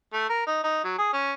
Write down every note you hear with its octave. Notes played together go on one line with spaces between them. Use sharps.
A3
A#4
D#4
D#4
F#3
G#4
C#4